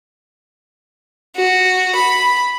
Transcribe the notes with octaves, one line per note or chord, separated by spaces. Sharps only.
F#4
B5